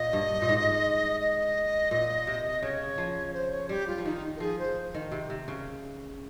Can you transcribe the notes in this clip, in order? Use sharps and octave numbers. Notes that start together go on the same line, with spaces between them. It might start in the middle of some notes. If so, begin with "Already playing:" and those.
Already playing: A#2 D#5
G2
A#2
G#2
D#5
A#2
C3
C#3 C#5
F3
C5
C#5
G3 G4
F4
F3
D#3 D#4
A#4
F3 G#4
C5
D#3
C3
C3
C#3